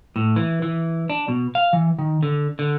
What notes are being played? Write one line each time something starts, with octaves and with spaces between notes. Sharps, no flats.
A2
E3
E3
D4
B2
F5
E3
D#3
D3
D3